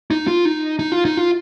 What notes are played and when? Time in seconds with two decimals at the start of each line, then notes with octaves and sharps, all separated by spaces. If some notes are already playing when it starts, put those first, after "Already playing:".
0.11 D#4
0.27 F4
0.45 D#4
0.79 D#4
0.92 F4
1.05 D#4
1.17 F4